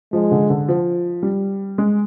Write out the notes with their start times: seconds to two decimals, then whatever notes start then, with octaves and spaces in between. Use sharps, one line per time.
0.13 F3 G#3
0.31 D3
0.50 D3
0.68 F3
1.23 G3
1.78 G#3